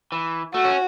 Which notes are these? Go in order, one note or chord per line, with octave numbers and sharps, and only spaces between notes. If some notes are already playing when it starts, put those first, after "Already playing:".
E3
A3 F#4
C#4